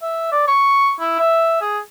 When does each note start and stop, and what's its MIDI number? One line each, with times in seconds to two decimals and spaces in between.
0.02 0.30 76
0.32 0.45 74
0.48 0.93 85
1.00 1.15 64
1.19 1.57 76
1.61 1.79 68